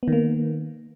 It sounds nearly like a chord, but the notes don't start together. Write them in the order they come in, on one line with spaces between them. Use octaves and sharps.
B3 D#3 A#3